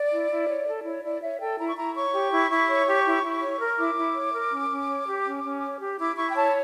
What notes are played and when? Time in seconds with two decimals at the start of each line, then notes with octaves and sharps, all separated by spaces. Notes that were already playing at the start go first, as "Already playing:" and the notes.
Already playing: D5
0.12 E4
0.31 E4
0.48 C#5
0.67 A4
0.85 E4 C#5
1.04 E4 D5
1.22 C#5 E5
1.40 A4 G5
1.59 E4 A#5
1.68 C#6
1.76 E4 A#5
1.95 C#5 C#6
2.13 G4
2.31 E4
2.51 E4
2.69 C#5
2.87 G4
3.06 E4
3.23 E4
3.42 C#5
3.60 A#4
3.78 E4 D6
3.96 E4
4.15 C#5
4.34 A#4
4.51 C#4
4.70 C#4
4.89 C#5
5.07 G4
5.25 C#4
5.44 C#4
5.63 C#5
5.80 G4
5.99 E4 D6
6.17 E4 C#6
6.30 G5
6.36 C#5 A5